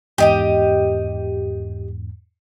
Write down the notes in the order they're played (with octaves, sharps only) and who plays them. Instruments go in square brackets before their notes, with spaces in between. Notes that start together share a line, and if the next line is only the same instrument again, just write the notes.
[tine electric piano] E2 G#2 [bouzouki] G4 D#5 G5